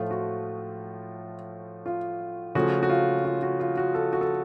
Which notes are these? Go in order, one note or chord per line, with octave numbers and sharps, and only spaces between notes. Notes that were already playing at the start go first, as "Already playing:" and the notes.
Already playing: A2 F3 A3 F4
F#4
F4
C#3 F3 A3 F#4
F#4
F4
F4
F#4
F4
F#4
A4
F#4
A4